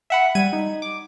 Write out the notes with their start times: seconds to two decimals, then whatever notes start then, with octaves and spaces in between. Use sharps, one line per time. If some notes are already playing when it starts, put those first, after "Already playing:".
0.10 E5 F#5 B5
0.35 G3 G#6 D#7
0.53 D#4
0.82 D6